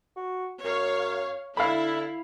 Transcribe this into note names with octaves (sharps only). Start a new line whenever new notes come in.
F#4
F#2 C#5 F5
D3 E4 F5 B5